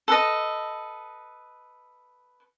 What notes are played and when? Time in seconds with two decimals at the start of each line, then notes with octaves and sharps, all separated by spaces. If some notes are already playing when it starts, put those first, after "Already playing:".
0.08 A4 B4 D#5